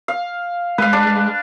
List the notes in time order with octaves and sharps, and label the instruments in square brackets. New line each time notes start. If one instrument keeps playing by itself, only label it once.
[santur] F5
[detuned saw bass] G#3 [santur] B4 F5
[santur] D4